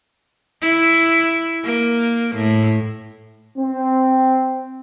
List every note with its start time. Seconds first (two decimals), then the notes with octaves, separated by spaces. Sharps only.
0.61 E4
1.64 A#3
2.36 A2
3.58 C4